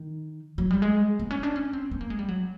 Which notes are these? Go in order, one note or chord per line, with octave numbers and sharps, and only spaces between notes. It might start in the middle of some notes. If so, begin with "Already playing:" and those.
Already playing: D#3
F#3
G3
G#3
B3
C#4
D4
C#4
C4
B3
A#3
G#3
G3
F#3